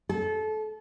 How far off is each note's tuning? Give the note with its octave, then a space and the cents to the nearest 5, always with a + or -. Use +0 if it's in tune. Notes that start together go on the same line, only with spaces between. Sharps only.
A4 -25